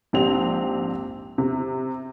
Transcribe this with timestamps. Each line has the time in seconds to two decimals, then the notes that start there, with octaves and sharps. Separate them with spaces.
0.13 A#1 G#2 C4 D4 G4 F7
1.38 C3